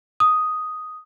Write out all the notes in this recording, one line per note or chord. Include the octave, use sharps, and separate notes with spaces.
D#6